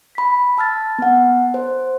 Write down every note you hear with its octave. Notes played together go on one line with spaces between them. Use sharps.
B5 B6
A5 E6 F6 A6
B3 F#5
C5